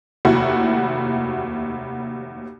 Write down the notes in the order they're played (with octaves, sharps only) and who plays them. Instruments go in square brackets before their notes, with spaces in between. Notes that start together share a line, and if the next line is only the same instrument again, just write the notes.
[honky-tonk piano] F1 D#2 E4 F#4